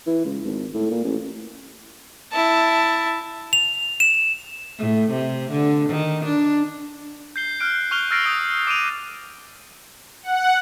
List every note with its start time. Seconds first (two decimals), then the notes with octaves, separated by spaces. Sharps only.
0.06 E3
0.25 C#2
0.45 G#1
0.74 A2
0.91 A#2
1.04 A1
2.32 E4 A5
3.53 F7
4.00 E7
4.78 A2
5.11 C3
5.52 D3
5.89 D#3
6.25 D4
7.36 G6 C7 G7
7.60 F6 F#6 D7
7.91 C#6 F6 F#6 F7 G7
8.11 E6 F6 A6 A#6 C7 D7
8.24 D#6 G6 D7 G7
8.67 D6 D7 D#7 F7
10.23 F#5